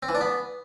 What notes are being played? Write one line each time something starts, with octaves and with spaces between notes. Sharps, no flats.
C4
E3
D4
B3